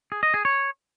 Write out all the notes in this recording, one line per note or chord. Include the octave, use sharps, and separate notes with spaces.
G#4
D#5
G#4
C#5